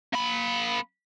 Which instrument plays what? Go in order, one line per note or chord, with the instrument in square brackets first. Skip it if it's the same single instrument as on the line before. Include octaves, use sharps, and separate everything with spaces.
[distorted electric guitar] A#3 B5